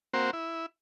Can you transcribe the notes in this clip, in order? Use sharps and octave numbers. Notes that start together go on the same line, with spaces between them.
A#3 C4 F#4 C5
E4